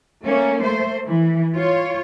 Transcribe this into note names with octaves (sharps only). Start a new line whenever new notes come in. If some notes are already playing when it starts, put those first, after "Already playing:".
A3 A#3 C#4
A3 C5
E3
F4 C#5